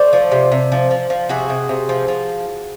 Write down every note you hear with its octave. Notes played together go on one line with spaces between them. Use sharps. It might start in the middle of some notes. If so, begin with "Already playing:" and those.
Already playing: A3 C5 D5
F3
C3
C3
F3
F3
F3
C3 F#4 G#4
C3
C3
F3
F3